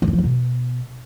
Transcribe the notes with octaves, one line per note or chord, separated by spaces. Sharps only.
D3
G2
F3
E2
B2